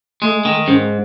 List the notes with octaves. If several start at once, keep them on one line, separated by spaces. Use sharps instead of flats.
G#3 A3
D#3 A3
G#2 C#4